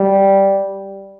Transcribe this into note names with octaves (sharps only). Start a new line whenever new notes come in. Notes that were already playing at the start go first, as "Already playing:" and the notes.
Already playing: G3